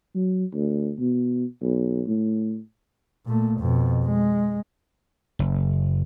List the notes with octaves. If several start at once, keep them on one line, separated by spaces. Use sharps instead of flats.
F#3
D2
B2
B1
A2
A#2 A3
F2 B2
G#3
F#1